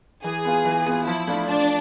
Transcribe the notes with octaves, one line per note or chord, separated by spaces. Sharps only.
E3 G#4
B3 F4
E3
B3 F4
F3 E4
A3 D4 F4
F3 D4